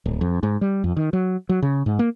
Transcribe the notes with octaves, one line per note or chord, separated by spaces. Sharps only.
D1
F2
G#2
G3
F2
D#3
F#3
F#3
C#3
G#2
A#3